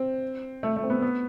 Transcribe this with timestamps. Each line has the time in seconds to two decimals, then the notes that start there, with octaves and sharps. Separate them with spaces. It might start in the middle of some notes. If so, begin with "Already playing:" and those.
Already playing: C4
0.63 A3
0.76 A3
0.84 C4
0.90 B3
1.02 B3